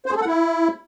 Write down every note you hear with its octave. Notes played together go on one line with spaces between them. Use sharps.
C5
G#4
A4
F#5
E4